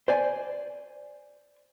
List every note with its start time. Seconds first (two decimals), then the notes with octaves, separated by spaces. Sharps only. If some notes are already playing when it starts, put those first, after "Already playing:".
0.08 C5 D5 G#5